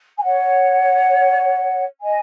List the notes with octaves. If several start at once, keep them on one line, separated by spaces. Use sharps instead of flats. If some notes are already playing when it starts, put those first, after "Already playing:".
G#5
C#5 F#5
D#5 G#5